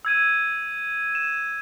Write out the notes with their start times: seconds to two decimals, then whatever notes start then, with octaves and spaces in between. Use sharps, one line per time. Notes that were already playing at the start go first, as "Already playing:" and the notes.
0.05 E6 G#6 D#7
1.15 E7